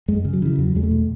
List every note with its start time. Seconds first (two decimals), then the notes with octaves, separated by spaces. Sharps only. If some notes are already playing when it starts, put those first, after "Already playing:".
0.08 F#2 G#3
0.25 C#3
0.33 F#3
0.42 C#3 E3
0.58 E2 F#3
0.75 E2 G#3
0.83 A3
0.91 B2